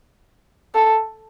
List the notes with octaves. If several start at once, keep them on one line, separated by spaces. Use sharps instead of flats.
A4